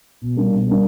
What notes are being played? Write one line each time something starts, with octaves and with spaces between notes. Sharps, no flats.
B2
G3 A#3 D4
B2
G3 A#3 D4